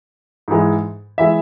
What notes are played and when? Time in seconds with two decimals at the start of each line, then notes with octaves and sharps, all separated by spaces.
0.48 G#2 E3 G#3
1.18 E3 G#3 E5